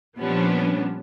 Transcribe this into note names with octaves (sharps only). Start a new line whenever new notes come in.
A#2 F3 G3 B3 C#4 D4